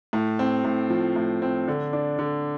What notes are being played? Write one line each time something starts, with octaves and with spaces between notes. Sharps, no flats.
A2
C4
A2
F3
A2
C4
D3
D4
D3